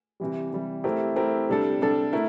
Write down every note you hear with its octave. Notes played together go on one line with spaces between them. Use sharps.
C3 E3 G3
C3 E3 G3
A3 C4 E4 G4 A#4
A3 C4 E4 G4 A#4
C3 G3 D4 A4
C3 G3 D4 A4
A3 E4 A#4